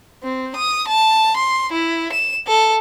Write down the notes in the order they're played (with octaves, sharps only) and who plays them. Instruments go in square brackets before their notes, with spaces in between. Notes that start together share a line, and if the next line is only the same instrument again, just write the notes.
[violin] C4
D#6
A5
C6
E4
E7
A4